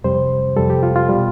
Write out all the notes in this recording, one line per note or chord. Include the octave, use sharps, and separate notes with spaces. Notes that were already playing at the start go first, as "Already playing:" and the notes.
F2 C3 G3 C5
F2 C3 G3 A4
G4
F4
F4
B2 G3